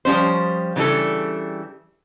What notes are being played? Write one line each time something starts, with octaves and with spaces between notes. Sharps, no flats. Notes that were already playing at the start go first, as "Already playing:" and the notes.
F3 G3 C#4 C5
C#3 E3 G3 D4 A4